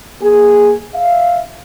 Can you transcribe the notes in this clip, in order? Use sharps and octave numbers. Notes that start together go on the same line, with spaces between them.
A#3 G#4
E5 F5